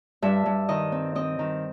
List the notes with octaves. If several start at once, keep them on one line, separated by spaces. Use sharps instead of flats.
G2 E5
G2
D#3 D#5
C4
C4 D#5
D#3